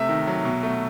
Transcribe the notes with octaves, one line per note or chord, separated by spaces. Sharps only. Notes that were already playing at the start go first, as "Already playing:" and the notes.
Already playing: C3 A3 E5
D#3
F#3
B2
A3